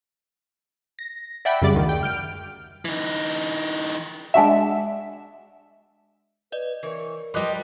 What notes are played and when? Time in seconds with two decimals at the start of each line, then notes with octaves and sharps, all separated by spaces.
0.99 A#6
1.45 D5 E5 F#5 G5 B5
1.62 F#2 C#3 G3 D5 D6
1.74 D2 D#3
1.89 G5
2.03 F6 G6 D7
2.85 E3 D#4
4.34 G#3 D4 F#4 E5
6.52 B4 D5 D#5
6.83 E3 A#4 C#5
7.34 F3 G3 B4 D#5 C6 D6 F#6